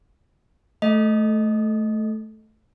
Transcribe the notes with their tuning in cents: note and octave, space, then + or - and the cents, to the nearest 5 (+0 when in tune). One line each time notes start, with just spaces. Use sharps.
A3 -15 A4 +0 D#5 +0